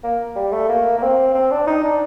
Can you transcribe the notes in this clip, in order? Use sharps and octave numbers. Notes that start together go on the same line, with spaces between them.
A#3
G3
A3
A#3
A#3
C4
C4
D4
D#4
D4